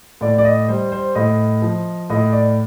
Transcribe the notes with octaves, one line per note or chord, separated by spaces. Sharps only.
A2 D5
D5
D#5
G3 C5
C5
A2 D#5
F3
A2 D#5
D5